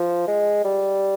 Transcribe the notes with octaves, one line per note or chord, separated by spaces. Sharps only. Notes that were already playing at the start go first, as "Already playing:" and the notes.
Already playing: F3
G#3
G3